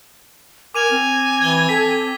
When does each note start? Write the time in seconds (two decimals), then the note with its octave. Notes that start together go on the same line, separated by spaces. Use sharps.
0.75 A#4 G#5 D6 D#7 F7
0.91 C4
1.42 E3 G#6 G7
1.69 A4 B6